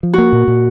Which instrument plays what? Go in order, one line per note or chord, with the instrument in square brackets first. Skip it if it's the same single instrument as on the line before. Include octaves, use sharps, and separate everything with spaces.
[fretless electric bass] F3
[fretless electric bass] A#3 [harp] F#4
[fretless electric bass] A#2
A#2